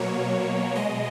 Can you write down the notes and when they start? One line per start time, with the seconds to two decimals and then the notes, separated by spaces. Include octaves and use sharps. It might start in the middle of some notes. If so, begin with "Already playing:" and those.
Already playing: B2 F#3 A#3 C#5
0.75 B2 G#3 D#5